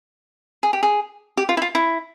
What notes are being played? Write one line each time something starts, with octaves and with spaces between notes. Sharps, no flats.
G#4
G4
G#4
G4
F4
E4
F4
E4